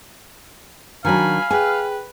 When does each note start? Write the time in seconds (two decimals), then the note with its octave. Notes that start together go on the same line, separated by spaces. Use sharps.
1.05 D#3 F#3 D4 F5 G#5 B5
1.51 G#4 B4 G5 G#5